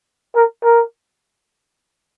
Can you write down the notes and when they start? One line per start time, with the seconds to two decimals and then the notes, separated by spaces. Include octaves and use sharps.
0.35 A#4
0.64 A#4